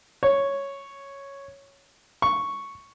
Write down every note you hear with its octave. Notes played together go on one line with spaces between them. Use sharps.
C#5
C#6